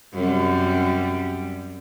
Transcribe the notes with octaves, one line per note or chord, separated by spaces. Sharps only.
F#2 C3 G3